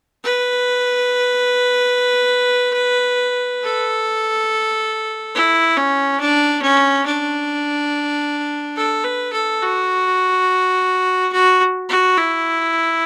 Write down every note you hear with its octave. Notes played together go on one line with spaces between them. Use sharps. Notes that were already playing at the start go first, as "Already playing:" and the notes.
B4
A4
E4
C#4
D4
C#4
D4
A4
B4
A4
F#4
F#4
F#4
E4